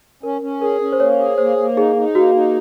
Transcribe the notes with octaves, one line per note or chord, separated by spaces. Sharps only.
C#4 A#4
C#4
G#4 A#4
C#4
C5
A#3 C#5
G#4
A#3 C5
A#3
D#4 G#4
D#4
A#3 F#4
D#4